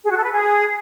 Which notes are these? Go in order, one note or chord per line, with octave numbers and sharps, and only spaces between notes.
G#4
F#4
A4
B4
G#4